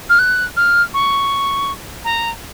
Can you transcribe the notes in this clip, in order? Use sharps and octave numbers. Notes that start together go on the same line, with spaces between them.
F6
F#6
F6
C#6
A#5